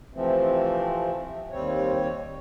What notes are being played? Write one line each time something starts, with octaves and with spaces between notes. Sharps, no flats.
C3 E3 F3 A3 C4
D#2 G3 C4 C#5